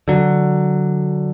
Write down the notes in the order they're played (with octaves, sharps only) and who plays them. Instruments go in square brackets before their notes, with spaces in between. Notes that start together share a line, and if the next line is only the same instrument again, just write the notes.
[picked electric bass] D3 F#3